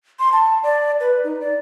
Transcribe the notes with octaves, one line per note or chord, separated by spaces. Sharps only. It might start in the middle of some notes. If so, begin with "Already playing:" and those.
C6
A5
D5
B4
D#4
D5